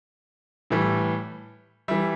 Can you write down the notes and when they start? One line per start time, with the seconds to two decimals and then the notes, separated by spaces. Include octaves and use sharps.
0.70 A2 E3 G3
1.88 E3 G3 E5